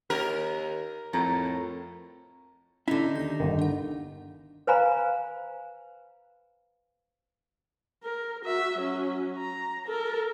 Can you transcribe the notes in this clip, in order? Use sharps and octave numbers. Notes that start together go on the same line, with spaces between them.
D#2 A#4
F2 A2 A#5
D3 C#4 D#4 E4 E5
D#2 G6 A#6
G1 D#3
D4 F#5
B4 C5 F5 G#5 A#5 B5
A#4
F#4 E5
F#3 C#4
A#5
A4 A#4